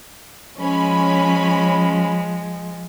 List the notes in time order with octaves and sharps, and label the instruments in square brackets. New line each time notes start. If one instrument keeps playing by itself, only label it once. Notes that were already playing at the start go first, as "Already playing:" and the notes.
[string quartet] F3 G#3 [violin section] C#4 B5